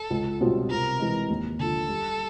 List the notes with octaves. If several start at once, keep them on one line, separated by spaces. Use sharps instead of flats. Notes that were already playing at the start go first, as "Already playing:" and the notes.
Already playing: A4
C#2
B2 G3 C4 F4
C3 A#4
E3 G#3
D#2
D3 F3 A4
G3